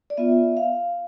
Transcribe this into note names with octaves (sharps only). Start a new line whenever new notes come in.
D5
B3 F4 E5
F5